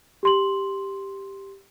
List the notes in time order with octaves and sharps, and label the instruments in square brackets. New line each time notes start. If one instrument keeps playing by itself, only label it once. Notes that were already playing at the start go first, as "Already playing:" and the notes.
[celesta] G4 C6 F#7